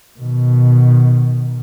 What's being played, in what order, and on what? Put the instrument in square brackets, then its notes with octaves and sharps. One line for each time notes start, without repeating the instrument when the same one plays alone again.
[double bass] B2 D#3